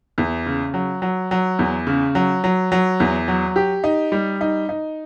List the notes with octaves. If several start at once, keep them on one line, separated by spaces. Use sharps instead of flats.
E2
C#3
F#3
F#3
F#3
E2
C#3
F#3
F#3
F#3
E2
F#3
G4
D#4
G3
D#4
D#4